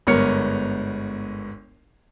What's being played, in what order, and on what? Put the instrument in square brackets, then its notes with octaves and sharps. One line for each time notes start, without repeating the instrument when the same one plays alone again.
[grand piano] G1 G#2 B3 A#4 C#5 C#7